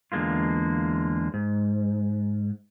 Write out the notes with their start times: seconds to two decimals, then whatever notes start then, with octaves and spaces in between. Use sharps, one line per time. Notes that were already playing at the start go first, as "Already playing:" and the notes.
0.12 E2 D3 G#3 A#3 F4
1.34 G#2